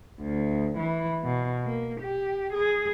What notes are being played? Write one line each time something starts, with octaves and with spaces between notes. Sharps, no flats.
D2
E3
B2
A#3
G4
G#4